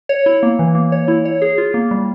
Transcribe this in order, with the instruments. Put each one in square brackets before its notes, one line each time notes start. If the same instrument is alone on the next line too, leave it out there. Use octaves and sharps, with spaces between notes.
[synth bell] C#5
E4
A#3
E3
A#3
C#5
E4
C#5
G#4
F4
A#3
G3